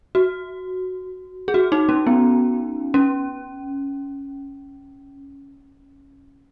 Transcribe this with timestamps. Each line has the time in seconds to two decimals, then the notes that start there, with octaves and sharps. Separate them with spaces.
0.15 F#4
1.48 G#4
1.54 F#4
1.72 D#4
1.89 C#4
2.07 B3
2.94 C#4